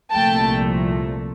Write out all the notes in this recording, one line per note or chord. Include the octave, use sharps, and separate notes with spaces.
C2 A#2 F3 A3 G5 A5